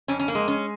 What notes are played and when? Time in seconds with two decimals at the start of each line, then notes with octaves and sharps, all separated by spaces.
0.08 F2 C#4
0.20 C#4
0.28 A#3
0.35 G#3
0.48 C#4